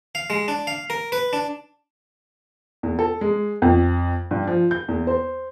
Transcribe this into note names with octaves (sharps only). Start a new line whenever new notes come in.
F5
G#3
D4
F5
A#4
B4
D4
E2
A4
G#3
F2
G2
F3
G6
E2
C5